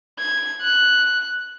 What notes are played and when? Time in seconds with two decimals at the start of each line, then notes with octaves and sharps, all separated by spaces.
0.19 G#6
0.62 F#6